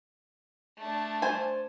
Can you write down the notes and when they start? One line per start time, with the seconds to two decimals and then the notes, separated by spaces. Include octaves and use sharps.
0.78 A3 D4
1.22 C5 G#5